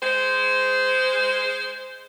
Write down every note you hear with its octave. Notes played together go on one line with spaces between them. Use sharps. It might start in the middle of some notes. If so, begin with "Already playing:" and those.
G#3 C5